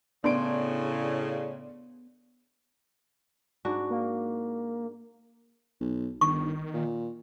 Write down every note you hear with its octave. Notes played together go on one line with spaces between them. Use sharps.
A2 C#3 B3 D4 C6 D7
G#2 D4 F#4
A#3
B1
G1 D#3 C#6
A#2